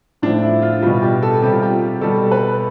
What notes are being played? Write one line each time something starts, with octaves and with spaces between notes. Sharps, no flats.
A2 F3 D4
E4
F4
B2 G3 F4
G4
A4
C3 G3 G4
F4
G4
G4
B2 G3 A4
B4